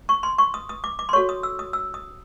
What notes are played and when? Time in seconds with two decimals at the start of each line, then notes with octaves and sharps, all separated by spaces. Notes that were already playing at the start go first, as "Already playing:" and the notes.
0.09 C#6
0.23 C6
0.38 C#6
0.54 D#6
0.69 D#6
0.84 D6
0.99 D6
1.09 C6
1.13 F#4 A4 C#5 C#6
1.29 D#6
1.43 E6
1.59 D#6
1.73 E6
1.94 D#6